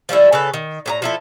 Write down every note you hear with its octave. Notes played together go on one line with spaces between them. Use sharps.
F3 G3 A3 E4
C#3 A4 B4
D#3
A2 G4 A#5
F3 E4 A4